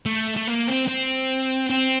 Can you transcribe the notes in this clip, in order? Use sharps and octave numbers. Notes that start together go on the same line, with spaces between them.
A3
A3
A#3
C4
C4
C4